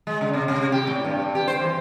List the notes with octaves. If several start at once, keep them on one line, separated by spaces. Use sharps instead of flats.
G#3
C#3
C3
C3
G4
A2
G2
G4
C5
E3